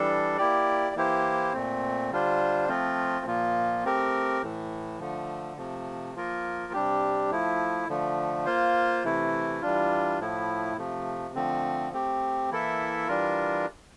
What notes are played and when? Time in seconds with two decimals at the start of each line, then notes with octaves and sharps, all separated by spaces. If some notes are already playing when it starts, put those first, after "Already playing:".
Already playing: E3 G3 D4 A4
0.37 A#3 E4 G4 D5
0.96 E3 A#3 E4 G4 C5
1.53 A#2 A3 C4
2.11 D3 G3 D4 F4 C5
2.68 F3 A3 C4 F4
3.26 A#2 F3 A#3 F4
3.85 A3 C4 G4 A#4
4.42 A2 E3 A3
4.99 D3 F3 A3
5.57 C3 F3 A3
6.15 F3 A#3 F4 A#4
6.73 C3 G3 D4 G4
7.31 F3 A3 E4
7.89 D3 F3 A3
8.46 A#3 F4 C5
9.04 C3 E3 A3 E4
9.61 E3 G3 D4 F4
10.19 A2 F3 A3 E4
10.77 C3 F3 A3
11.35 D3 F3 A3 C4
11.93 A3 C4 G4
12.51 E3 A#3 E4 A4 E5
13.08 E3 G3 D4 F4 A#4